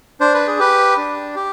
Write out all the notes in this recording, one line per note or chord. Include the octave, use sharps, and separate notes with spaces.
D4 C5
B4
G#4
G4 B4
D4
G4